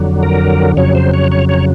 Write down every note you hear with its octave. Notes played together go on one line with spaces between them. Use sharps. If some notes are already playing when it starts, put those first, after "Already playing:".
Already playing: F2 D3 F#3
A#4
F2 C#3 F#3 C#5
C5
C#5
C#5
C#5